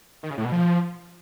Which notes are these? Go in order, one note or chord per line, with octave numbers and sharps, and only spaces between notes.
D#3
C#3
A2
B2
F3